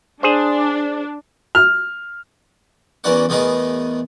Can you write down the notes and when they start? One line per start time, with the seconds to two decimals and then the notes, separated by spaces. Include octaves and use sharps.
0.23 D4 G#4 C5
1.55 F6
3.04 E2 E3 C#4 A#4 D5 F#5
3.29 E2 A3 B3 G#4 A#4 D#5